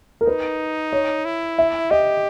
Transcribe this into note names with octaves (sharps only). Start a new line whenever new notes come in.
A#4
D#4 B4
C#5
E4
E5
G4 D#5